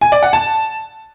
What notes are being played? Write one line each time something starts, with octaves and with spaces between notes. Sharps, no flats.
G#5
D5
F#5
A5